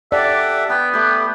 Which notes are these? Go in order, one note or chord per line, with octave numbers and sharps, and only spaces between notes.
G4 A4 D5 E5 F#5
B3 B4 G5
A3 G4 B4